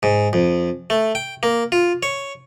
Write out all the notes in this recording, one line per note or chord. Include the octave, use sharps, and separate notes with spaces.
G#2
F2
A3
G5
A#3
F4
C#5